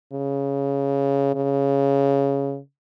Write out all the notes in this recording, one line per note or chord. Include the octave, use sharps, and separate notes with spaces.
C#3
C#3